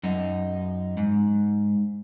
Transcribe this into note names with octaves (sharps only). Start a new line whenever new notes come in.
F#2 D#4
G#2